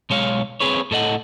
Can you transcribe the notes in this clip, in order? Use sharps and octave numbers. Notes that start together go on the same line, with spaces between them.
B1 G#3 C#5 F5
C4 G#4 B4 C#5
A2 A4 D#5 F#5